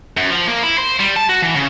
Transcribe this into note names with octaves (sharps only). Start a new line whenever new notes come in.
F#2
F3
A#3
E4
C5
G3
A5
F#4
E3
C#3